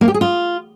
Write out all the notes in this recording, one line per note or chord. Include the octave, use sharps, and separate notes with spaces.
A#3
G4
G#4
F4